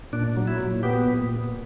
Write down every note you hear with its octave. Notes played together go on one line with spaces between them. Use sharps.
A#2 D4
F#3
E4
A#2
B3 G4
A#2